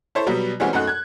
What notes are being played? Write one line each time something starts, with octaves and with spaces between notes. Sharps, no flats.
E4 A4 C5 C#5
B2 F#3 G3 B3
E3 G3 G#3 C4 C#4 F#4
F#2 A3 D#4 F#5 F#6
F#6 G#6